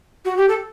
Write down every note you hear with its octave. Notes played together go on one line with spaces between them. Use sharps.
F#4
G4
A4